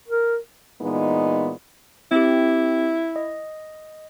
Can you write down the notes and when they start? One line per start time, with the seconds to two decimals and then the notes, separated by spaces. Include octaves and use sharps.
0.08 A#4
0.81 A#2 E3 G#3 B3 D#4
2.11 C4 E4 G4
3.16 D#5